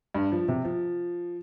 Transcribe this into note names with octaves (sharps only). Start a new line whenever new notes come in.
G2
F3
C3
F3